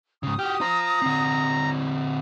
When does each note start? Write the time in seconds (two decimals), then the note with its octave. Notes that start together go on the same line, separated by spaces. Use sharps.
0.23 G#2 C#3 D#6
0.39 F#4 G4 F6 G6
0.61 F4 C5 A#5
1.02 D3 C4